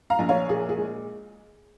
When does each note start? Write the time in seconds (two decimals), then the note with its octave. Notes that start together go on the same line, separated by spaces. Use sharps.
0.10 F5 A#5
0.19 A#1
0.29 C#5 F5
0.49 A#2 G#4
0.69 G#4
0.78 G#3